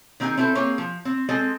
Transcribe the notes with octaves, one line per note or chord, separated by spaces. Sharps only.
D#3 C4 D#4 G4 G#4
C4 E4 A4 A#4 C5
A#3 C4 G#4 C#5
F3
C4
G#3 C4 A4 D#5